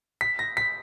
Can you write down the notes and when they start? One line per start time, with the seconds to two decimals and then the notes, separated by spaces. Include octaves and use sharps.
0.21 B6
0.39 A#6
0.57 B6